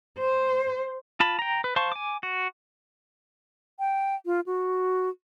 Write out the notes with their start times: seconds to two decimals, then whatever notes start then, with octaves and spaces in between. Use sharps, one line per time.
0.18 C5
1.20 F4 A5 B5
1.39 G5 A#5
1.64 B4
1.76 C5 F5 A5 C6 C#6
1.92 G#5 D6
2.23 F#4
3.79 G5
4.26 F4
4.46 F#4